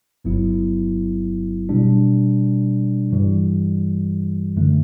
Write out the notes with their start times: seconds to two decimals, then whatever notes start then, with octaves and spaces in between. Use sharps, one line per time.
0.25 G1 G2 F#3 B3 E4
1.69 B2 G3 D4
3.12 G2 E3 G3
4.56 F#2 D3 A3 D4